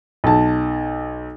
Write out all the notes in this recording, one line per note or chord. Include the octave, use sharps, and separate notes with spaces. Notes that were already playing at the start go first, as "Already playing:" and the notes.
B1 A5